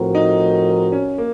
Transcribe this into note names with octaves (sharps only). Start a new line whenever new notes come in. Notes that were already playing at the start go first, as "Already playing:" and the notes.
Already playing: A2 F3 C4 F#4 A#4
D#4
C#4
A#3